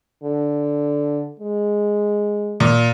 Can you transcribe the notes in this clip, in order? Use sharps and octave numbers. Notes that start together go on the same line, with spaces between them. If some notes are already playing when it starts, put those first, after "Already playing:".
D3
G#3
A#2